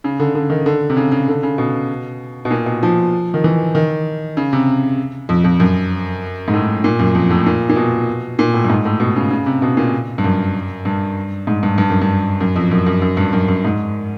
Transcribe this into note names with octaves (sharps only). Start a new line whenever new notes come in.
C#3
D3
D3
D#3
D3
C3
C#3
C#3
D3
C#3
B2
B2
A#2
B2
F3
D#3
E3
D#3
C#3
C3
F2
F2
F#2
G#2
A2
A#2
F#2
F2
A2
A#2
A#2
B2
A#2
A2
G2
G#2
A2
B2
C#3
C#3
C3
B2
A#2
G2
F#2
G2
G#2
G2
G2
F#2
G2
F#2
F2
F#2
F#2
F#2
G2
F#2
F#2
G#2